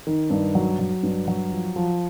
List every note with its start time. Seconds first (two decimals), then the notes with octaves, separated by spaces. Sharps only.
0.07 D#3
0.30 G2
0.55 F#3
0.79 F#3
1.03 G2
1.28 F#3
1.51 F3
1.76 F3